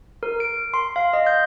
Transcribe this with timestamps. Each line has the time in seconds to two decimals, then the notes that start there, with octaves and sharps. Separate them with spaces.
0.23 A#4
0.40 D7
0.74 C6
0.96 F5
1.13 D#5
1.27 G6